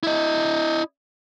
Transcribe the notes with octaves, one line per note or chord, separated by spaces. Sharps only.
E4 D#5